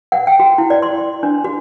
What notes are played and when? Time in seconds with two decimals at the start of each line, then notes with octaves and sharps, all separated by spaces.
0.12 F#5
0.27 G5
0.40 F#4
0.58 E4
0.70 D5
0.82 C6
1.23 D4
1.44 F#4